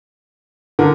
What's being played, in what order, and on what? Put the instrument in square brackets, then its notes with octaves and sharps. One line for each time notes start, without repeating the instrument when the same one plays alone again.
[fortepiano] D3 [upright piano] A#4